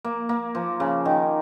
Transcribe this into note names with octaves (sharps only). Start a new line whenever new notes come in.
A#3
A#3
F3
C#3
D#3